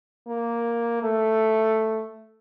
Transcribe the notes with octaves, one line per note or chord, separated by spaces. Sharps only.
A#3
A3